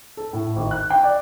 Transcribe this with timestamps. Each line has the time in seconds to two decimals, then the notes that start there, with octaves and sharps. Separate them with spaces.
0.17 A4
0.33 A2
0.56 G#1
0.71 F#6
0.90 G5
1.04 D5